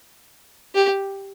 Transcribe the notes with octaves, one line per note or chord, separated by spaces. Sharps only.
G4